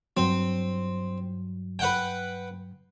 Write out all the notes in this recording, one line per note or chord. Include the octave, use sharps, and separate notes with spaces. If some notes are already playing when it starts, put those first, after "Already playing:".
G2 F#3 C4
B4 F#5 G5